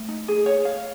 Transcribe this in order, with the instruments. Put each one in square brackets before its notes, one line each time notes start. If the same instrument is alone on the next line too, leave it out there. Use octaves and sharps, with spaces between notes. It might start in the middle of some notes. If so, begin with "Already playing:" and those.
Already playing: [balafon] A3
[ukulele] D#4
G#4
C#5
F5